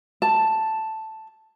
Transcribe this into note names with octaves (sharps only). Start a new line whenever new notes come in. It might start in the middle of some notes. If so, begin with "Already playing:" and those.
A5